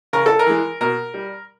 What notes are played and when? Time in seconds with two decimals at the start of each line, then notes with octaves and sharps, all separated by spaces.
0.13 C#3 A#4
0.26 A4
0.39 A#4
0.46 E3 G#3
0.81 B2 A#4
1.14 G3